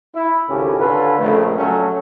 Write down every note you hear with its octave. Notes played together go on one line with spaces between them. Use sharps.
E4
G#1 C#2 C#3 C#4 G4 A4
D3 C#4 F4 A4 B4
A#1 F2 C#3 A3
F#3 A3 C#4